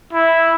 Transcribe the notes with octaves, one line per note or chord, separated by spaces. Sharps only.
E4